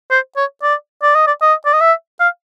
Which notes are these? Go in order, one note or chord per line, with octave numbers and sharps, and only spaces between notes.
C5
C#5
D5
D5
D#5
D5
D#5
D5
D#5
E5
F5